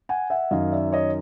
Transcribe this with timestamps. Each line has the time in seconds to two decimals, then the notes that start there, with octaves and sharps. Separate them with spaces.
0.09 F#5 G#5
0.30 E5 F#5
0.51 F#2 D#3 D#5 F5
0.72 D5 E5
0.92 C#5 D#5